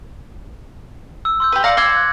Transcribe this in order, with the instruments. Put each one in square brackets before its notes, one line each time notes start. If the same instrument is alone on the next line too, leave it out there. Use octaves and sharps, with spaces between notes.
[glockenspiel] E6
C6 E6 G6
[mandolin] G4 B4
[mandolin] D5 F5 A#5 [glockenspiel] A#6 C#7 F#7
[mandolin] C5 E6 [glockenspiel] D6 G#6
[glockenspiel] F#6